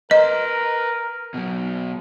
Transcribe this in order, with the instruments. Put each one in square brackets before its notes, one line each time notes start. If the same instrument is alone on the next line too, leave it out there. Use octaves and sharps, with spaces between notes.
[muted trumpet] A#4 [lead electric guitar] B4 C6 [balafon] D#5
[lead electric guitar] B2 F#3